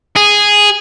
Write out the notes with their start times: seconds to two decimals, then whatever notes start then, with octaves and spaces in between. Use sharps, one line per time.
0.17 G#4